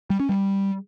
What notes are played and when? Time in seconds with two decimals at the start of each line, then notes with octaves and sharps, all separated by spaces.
0.10 G3
0.20 C#4
0.29 G3